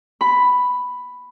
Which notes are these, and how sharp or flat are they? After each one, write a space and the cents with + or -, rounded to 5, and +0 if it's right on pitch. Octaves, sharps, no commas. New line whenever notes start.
B5 +5